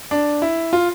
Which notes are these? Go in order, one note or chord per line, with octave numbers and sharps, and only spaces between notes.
D4
E4
F4